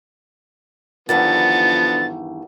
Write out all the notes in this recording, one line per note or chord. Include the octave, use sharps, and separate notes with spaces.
E2 G2 D3 D#3 F3 B3 A6